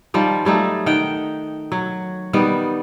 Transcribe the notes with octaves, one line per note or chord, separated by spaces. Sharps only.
D#3 F3 G3
F#3 G3 A3 D#4
D#3 F#5 G5
F#3
D#3 G3 B3